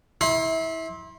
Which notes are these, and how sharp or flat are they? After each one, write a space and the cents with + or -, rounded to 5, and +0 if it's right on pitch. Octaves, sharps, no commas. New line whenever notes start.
E4 -25 C6 +25